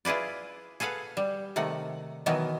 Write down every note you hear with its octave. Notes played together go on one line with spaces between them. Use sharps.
E4 F4 G#4 B4 D5
G#4 A4 B4 F5 F#5
G3
C3 D#3 A3 F#5
B2 D#3 E3 F#3 B3